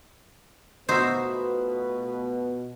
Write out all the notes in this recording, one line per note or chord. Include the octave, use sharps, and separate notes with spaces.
B2 A3 D#4 F4 F#4 B4 C5 E5